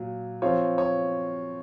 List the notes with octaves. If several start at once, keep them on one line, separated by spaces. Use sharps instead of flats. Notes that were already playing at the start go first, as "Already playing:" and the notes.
Already playing: A#2 F#3
F3 C4 F4 C#5
C#5